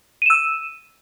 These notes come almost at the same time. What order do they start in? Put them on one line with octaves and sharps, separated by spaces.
D#7 E7 E6